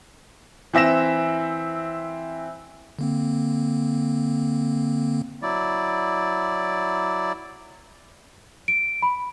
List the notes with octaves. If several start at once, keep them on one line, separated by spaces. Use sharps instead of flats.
E3 C4 E5 A#6 E7
D3 A#3 C4
F#3 E4 D5
D7
B5